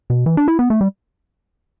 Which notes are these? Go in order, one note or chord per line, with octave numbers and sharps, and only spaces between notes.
B2
E3
D4
E4
B3
A3
G3